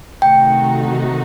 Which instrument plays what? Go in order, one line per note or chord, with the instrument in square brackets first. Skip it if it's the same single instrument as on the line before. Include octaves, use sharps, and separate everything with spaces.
[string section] C3 D#3 A3 D#4 F#4 [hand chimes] G5